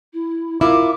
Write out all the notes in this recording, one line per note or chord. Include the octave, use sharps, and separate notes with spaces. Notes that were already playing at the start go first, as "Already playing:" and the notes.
E4
E4 F4 A#4 D6